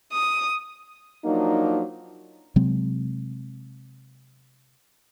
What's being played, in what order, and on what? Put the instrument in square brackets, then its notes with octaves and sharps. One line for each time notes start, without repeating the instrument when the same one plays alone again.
[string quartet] D#6
[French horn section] F3 F#3 A#3 D4 D#4
[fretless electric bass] C3 F#3 G#3 C4